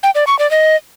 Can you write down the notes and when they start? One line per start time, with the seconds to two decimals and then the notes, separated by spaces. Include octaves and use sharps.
0.03 G5
0.15 D5
0.27 C#6
0.39 D5
0.51 D#5